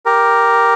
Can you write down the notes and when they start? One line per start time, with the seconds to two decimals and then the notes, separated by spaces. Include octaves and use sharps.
0.06 G4 A#4